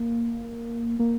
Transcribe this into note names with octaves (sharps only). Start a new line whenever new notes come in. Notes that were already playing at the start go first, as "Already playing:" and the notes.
Already playing: A#3
A#3